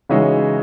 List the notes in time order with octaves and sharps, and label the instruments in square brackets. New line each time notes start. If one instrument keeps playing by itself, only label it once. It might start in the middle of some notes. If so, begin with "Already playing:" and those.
[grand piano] C#3 E3 [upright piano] G#3 D#4 F#4 C#5 E5